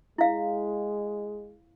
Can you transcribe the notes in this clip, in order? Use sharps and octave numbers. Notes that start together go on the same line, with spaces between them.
G#3 E4 F5